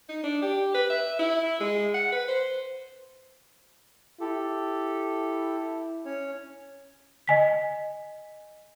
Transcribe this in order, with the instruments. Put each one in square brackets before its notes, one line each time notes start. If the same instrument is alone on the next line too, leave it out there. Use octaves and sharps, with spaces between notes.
[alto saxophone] D#4
D4
G4
B4
E5
E4
G#3
F#5
B4
C5
[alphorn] E4 [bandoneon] G4 A4
[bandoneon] C#4 C#5
[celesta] D#5 G#5 B6